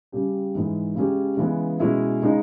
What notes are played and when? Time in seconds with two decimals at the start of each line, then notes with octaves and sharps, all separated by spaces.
0.12 C#3 G3 C#4 G4
0.55 G#2 E3 G#3
0.95 C#3 G#3 C#4 G4
1.37 C#3 E3 G#3 B3
1.80 B2 G#3 C#4 E4
2.22 C#3 G#3 D#4